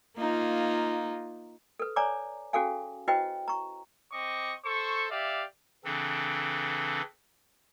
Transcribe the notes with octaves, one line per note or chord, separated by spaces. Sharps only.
A#3 D#4 F4
A4 B4
C#5 D5 G#5 A#5 D6
C#4 F#4 G#4 A4 F5 G#5
E4 F#4 B4 C5 D#5 G5
A#5 C#6
C4 D#5 C#6 D6
A4 C5 C#6
G4 D5 E5 F5
C#3 E3 C4 D4 A4